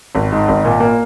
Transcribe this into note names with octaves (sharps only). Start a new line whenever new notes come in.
G#1
G#2
G#1
A#2
A#3